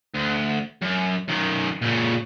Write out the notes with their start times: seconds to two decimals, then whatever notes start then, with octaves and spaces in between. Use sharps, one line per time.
0.15 D2
0.82 F#2
1.29 F#2 D#3
1.82 A#2 C#3